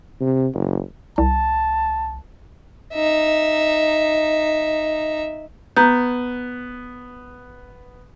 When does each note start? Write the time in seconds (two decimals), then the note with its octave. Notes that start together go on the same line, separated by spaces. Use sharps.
0.20 C3
0.54 F#1
1.18 C2 A5
2.94 D#4 E5
5.76 B3 A#5 G6